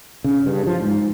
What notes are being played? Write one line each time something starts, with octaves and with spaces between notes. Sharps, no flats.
C#3
G2
F3
G#2